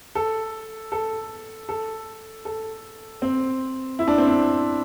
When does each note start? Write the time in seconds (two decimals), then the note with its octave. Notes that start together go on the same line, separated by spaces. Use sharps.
0.15 A4
0.92 A4
1.69 A4
2.45 A4
3.22 C4
3.99 E4
4.08 D4
4.18 C4
4.27 D4